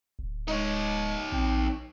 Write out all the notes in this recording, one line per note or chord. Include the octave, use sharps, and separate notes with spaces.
D1
G#3 D#4 C#5
A#1 C4